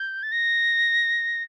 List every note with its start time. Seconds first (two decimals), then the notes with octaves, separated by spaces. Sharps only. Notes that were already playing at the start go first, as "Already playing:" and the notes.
Already playing: G6
0.23 A6
0.32 A#6